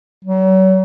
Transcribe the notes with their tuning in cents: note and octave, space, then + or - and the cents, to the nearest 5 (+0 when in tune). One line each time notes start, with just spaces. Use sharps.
F#3 +40